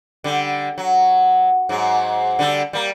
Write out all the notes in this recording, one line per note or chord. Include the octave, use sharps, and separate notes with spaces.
D3 G3
F#3
G#2 F#3
D3 G3 A4
G3 A#3